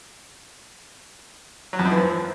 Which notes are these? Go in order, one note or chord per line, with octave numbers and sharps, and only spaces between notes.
F#3
F2
F#2
E3
F3